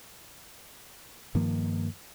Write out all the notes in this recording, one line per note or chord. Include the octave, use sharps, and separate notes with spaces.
G2 D#3 F3 A#3